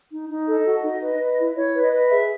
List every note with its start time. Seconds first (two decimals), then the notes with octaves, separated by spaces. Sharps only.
0.11 D#4
0.29 D#4
0.48 A4 D#5
0.65 F#4
0.83 D#4
1.01 B4
1.20 B4
1.38 E4
1.56 E4 C#5
1.74 B4
1.82 D#5
1.92 B4
2.09 G#4 E5